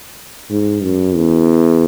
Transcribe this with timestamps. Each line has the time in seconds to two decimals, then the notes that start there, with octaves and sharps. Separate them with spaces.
0.51 G#2
0.83 F#2
1.16 E2